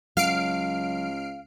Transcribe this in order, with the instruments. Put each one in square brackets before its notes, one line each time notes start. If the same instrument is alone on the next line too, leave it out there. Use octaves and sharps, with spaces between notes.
[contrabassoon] C#2 [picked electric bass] F#3 [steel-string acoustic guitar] F5 [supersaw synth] F6 C7 D7